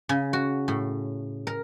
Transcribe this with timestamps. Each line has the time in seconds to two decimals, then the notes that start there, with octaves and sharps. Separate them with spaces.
0.09 C#3
0.33 F#4
0.68 A2
1.47 A#4